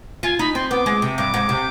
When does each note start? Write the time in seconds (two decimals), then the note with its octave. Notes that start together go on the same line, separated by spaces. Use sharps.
0.23 F4 G#5
0.39 D#4 B5
0.55 C4 C6
0.71 B3 D6
0.86 G#3
1.02 C3
1.18 G2 D6
1.34 G#2
1.49 C3